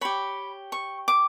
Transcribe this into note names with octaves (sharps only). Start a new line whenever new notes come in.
G4 C#5 B5
C#6
D6